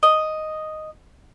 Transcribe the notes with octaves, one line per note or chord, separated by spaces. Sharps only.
D#5